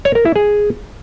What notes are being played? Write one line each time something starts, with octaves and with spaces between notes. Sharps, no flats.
C#5
A#4
E4
G#4